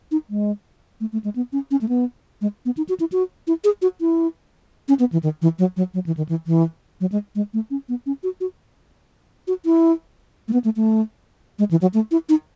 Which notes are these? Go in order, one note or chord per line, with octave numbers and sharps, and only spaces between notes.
D#4
G#3
A3
A3
G#3
B3
C#4
C#4
A3
B3
G#3
B3
D#4
F#4
E4
F#4
E4
G#4
F#4
E4
C#4
B3
E3
D#3
E3
F#3
F#3
F#3
E3
D#3
E3
E3
F#3
G#3
G#3
A3
C#4
B3
C#4
F#4
F#4
F#4
E4
A3
B3
A3
A3
G#3
E3
F#3
A3
E4
D#4